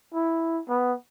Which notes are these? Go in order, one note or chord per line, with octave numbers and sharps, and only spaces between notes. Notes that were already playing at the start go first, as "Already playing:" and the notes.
E4
B3